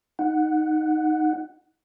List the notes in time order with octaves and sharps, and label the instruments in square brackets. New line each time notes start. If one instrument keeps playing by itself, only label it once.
[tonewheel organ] D#4 F#5